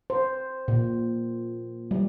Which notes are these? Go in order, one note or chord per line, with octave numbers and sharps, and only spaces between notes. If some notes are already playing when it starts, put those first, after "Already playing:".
C5
A#2
G3